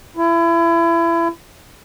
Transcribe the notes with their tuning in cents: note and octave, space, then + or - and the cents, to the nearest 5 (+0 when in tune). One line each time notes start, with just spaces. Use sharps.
E4 +30